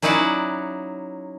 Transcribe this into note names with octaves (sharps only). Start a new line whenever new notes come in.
F#3 C#4 D#4 E4 D5 F#5